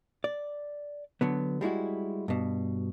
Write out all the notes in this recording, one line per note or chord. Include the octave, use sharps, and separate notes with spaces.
D5
D3 F#3 B3
G3 G#3 E4 F#4
G2 B2